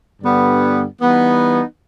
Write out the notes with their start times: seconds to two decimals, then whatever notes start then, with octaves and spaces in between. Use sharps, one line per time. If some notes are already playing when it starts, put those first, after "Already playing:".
0.22 G2 D3 G3 B3
0.99 E3 G3 B3 D#4